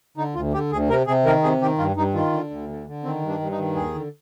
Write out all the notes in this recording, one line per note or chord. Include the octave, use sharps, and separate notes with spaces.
D3 D#4
D2 F4
D3 G4
D2 G#4
C3 A#4
C3 G#4
D#3 A#4
C3 G#4
D#3 G4
G2 F4
G2 D#4
D#3 F4
D3
D2
D3
D3
D#3 C4
G2
D4
G2
D#4
D#3
D#2 G#4
D3